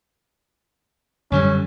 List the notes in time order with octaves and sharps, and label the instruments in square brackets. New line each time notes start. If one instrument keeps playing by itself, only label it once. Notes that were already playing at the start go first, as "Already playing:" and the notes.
[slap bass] F#2 D3 G3 [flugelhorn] C#4